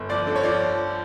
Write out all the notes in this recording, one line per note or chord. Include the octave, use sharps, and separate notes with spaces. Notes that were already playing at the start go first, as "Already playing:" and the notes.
Already playing: G1
F3 D5
D3
C#5
F3 D5